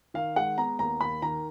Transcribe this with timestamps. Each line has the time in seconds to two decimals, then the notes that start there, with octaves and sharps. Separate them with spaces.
0.14 D#3 F5
0.36 G#3 F#5
0.58 B3 A#5
0.79 D#2 A#5
1.01 D#2 B5
1.22 D#3 A#5